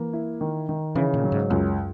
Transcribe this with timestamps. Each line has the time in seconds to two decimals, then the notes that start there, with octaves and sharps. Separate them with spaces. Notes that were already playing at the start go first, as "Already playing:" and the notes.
Already playing: E3 A#3
0.13 E4
0.41 D#3
0.69 D#3
0.95 C#3 E3
1.14 A#2
1.24 F#3
1.32 G#2
1.50 C#2 F#2